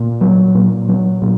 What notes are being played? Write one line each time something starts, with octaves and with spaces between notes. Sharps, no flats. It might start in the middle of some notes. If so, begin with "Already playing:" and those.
Already playing: A#2
F#3
A#2
F#3
A#2